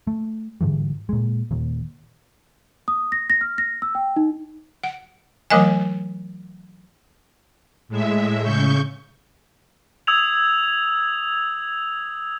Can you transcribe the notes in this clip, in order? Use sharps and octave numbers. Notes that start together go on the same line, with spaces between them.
A3
G#2 D3 E3 G3
A#2 G#3
D#1 D#2
D#6
A#6
A#6
F6
A#6
E6
G5
D#4
F#5
E3 F#3 A3 A#4 D#5 G#5
A2 G#3 E5
C#3 C#6 G6
D#6 E6 G#6 F7